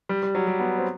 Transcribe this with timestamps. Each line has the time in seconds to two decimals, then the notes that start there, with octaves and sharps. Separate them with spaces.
0.09 G3
0.23 G3
0.35 F#3
0.47 G3
0.60 B3
0.78 C4